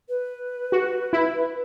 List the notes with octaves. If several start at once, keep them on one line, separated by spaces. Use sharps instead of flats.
B4
F#4
E4